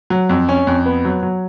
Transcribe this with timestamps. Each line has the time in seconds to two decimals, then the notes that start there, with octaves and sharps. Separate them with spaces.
0.10 F#3
0.29 F2
0.49 C#4
0.67 F2
0.86 B3
1.05 F#3
1.23 F#3